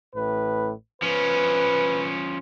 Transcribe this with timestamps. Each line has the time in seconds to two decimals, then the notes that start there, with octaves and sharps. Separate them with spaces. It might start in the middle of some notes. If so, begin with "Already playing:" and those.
0.15 A1 A2 B4
1.02 F3 C#4 B4